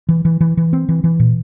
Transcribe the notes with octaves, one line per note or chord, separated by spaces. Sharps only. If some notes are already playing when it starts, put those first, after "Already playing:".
E3
E3
E3
E3
C4
E3
E3
A#2